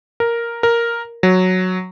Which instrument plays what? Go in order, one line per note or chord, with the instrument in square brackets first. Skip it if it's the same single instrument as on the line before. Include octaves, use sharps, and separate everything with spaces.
[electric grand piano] A#4
A#4
F#3